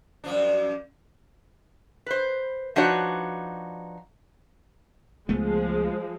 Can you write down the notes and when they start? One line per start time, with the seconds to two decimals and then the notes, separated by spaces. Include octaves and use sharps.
0.24 F#2 F3 D4
2.06 B4 C5
2.76 F3 D4 D#4 F#4 B4 C#5
5.29 C#2 F3 G#3 A3 B3